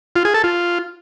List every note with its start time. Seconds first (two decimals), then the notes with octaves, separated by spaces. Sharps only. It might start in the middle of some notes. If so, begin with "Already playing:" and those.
0.16 F4
0.25 G#4
0.34 A4
0.44 F4